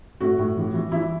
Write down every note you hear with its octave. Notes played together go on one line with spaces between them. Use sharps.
A2 F#4
A2
E3
E3
E3 E4